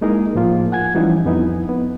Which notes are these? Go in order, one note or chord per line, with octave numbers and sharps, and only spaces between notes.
G#3 A#3 D#4 E4 G#4 A#4
A2 F3 A#3 F4
F#5 G#5 G#6
E3 F3 G3 C#4 D#4 E4
F2 B3 D#4 E4
B3